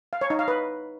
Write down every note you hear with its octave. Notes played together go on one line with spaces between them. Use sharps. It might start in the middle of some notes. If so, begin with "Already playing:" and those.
F5
C#5
D#4
F5
B4